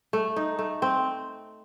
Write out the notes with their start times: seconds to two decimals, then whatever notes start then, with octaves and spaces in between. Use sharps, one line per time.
0.13 A3
0.36 D#4
0.59 A3
0.82 C4